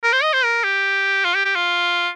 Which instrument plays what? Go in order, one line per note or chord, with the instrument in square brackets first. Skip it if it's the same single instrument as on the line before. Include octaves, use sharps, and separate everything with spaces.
[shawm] A#4
C5
D#5
C5
A#4
G4
F4
G4
G4
F4